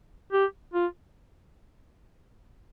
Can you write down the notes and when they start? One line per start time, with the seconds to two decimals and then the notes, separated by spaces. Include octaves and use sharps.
0.33 G4
0.74 F4